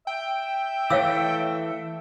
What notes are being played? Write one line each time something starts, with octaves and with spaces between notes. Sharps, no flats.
E5 G5
E3 A3 C#5 F5 E6